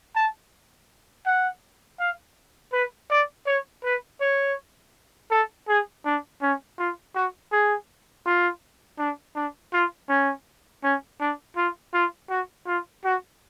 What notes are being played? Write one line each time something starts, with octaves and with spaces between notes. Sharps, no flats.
A5
F#5
F5
B4
D5
C#5
B4
C#5
A4
G#4
D4
C#4
F4
F#4
G#4
F4
D4
D4
F4
C#4
C#4
D4
F4
F4
F#4
F4
F#4